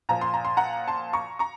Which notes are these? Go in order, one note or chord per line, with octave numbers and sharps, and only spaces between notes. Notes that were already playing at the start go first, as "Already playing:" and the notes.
A#2 F3 A#5
C6
A#5
C6
F#5 A#5
A5 C6
A#5 C#6
A#5 C#6